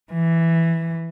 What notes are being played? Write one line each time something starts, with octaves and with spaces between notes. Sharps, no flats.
E3